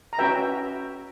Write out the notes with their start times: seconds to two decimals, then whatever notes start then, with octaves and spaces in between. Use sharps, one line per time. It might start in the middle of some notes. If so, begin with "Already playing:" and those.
0.13 A#5
0.18 C#4 F#4 B4 E5 G5